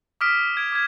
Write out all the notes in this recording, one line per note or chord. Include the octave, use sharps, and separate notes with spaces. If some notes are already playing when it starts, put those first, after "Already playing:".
D6 D#6 F6 B6 D7
G#6 D7
D6 G#6